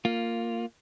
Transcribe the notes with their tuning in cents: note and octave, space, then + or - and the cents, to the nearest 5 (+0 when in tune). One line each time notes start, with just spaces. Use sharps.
A#3 -15 F4 +0